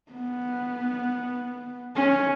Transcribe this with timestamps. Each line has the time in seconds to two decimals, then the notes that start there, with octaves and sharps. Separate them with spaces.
0.12 B3
1.96 C#4